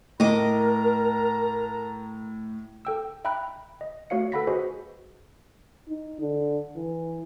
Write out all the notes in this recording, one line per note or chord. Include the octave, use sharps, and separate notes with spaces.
A2 A#4 D#5 A5 A#5 D6
A4 G5 E6
E5 G5 A#5 B5 F#6
D#5
A3 F#4 C#5 F5 C#7
A4 B4 F#5 B5 A#6 B6
F#4 G#4 B4 C5 D#5 G#5
D#4
D3
E3